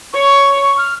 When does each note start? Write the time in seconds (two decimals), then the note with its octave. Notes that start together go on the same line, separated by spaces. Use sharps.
0.13 C#5 C#6
0.78 F6